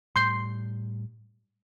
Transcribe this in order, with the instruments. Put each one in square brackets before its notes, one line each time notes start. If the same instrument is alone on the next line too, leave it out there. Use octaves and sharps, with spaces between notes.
[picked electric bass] A2 G3 [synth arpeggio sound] C6 G6 C7